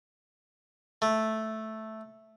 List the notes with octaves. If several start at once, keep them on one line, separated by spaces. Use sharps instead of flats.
A3